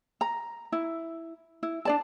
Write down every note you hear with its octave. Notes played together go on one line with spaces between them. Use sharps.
A#5
E4
E4
D4 D5 A5